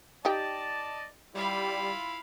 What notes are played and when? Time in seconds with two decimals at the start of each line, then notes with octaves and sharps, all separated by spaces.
0.25 D#4 G4 D5 D#5 G5 A5
1.35 G3 E4 F4 F5 B5